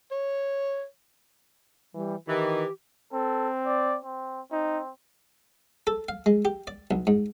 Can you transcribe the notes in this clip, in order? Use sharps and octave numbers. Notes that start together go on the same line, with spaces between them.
C#5
E3 G3
D#3 E3 G4
C4 A4
D5
C4
C4 D#4
A4
F5
G#3
G4
D5
B1
G#2